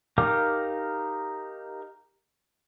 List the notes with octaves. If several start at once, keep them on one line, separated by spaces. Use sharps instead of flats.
D#4 G4 A#4 F5 D6